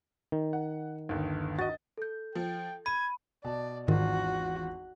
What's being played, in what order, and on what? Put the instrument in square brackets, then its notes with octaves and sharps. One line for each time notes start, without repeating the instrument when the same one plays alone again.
[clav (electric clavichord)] D#3
[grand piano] F#5
G1 D#2
[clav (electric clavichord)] F#4 [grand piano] D#5 A6
[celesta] A4 G6
[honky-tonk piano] F3 [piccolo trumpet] G5
[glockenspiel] B5 [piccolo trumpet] G#6 [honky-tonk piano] D#7
[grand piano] B2 A5 [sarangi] D5
[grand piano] G#1 E2 F4 [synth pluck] G#2 D#3 [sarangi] F#4